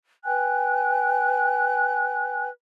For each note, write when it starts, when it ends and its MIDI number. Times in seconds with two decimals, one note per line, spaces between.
0.24 2.48 71
0.24 2.48 79
0.24 2.48 80
0.24 2.48 90